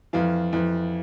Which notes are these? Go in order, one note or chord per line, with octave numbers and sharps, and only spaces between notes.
F2 E3 F5
F2 E3